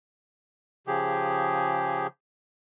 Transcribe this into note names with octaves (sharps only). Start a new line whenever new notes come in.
C#3 F3 G4 G#4